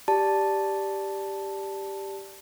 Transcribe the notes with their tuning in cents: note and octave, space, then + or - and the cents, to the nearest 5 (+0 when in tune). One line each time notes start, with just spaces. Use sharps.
G4 +0 D5 +0 A5 +0